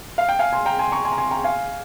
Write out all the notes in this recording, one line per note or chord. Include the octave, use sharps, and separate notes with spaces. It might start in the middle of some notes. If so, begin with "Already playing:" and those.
F5
G5
F5 G#5
G#5 C6
G5 A#5
G#5 C6
A#5 C#6
G#5 C6
A#5
G#5 C6
G5 A#5
F5 G#5